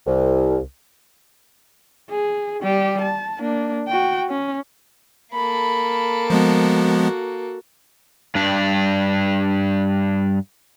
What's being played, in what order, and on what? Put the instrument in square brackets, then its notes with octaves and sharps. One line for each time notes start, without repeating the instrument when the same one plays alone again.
[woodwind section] C2
[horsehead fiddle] G#4
G3 G4
A5
A#3 D4
F#4 G5
C#4
[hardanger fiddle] A#3 A4 [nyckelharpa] B5
[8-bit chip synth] F3 G#3 B3 [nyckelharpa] F#4
[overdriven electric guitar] G2 D4